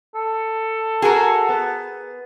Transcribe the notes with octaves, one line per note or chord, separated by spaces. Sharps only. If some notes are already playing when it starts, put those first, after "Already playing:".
A4
F#4 G#4 A#4
B3